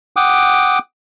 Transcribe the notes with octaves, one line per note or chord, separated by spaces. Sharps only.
F#5 G5 D6 D#6